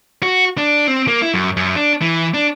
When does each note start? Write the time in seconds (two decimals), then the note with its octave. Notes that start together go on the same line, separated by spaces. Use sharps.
0.23 F#4
0.58 D4
0.88 C4
1.08 A#3
1.22 E4
1.34 F#2
1.57 F#2
1.76 D4
2.02 E3
2.34 D4